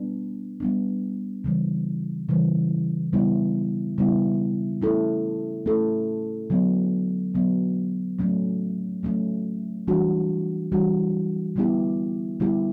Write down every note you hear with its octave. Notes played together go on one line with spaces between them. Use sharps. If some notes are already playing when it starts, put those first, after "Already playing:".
Already playing: G3 B3 D4
G3 B3 D4
C#3 E3 G3
C#3 E3 G3
C#3 G3 B3 E4
C#3 G3 B3 E4
A3 C#4 E4 A4
A3 C#4 E4 A4
D3 F#3 B3
D3 F#3 B3
F#3 A3 C#4
F#3 A3 C#4
E3 G3 D4 F#4
E3 G3 D4 F#4
D3 G3 B3 E4 G4
D3 G3 B3 E4 G4